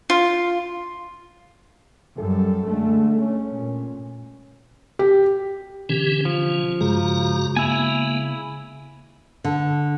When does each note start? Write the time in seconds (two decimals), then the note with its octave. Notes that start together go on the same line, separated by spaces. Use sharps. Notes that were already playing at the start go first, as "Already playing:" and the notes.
0.10 F4
2.18 F#2 G3 A4
2.67 D3 G#3 A3
3.18 C#4
3.51 A#2
4.99 G4
5.89 B2 D3 E3 C#4 G4
6.25 F3 C#4
6.81 G2 C#3 G#3 F#4 A#5
7.56 A#3 B3 E4 G#5
9.44 D3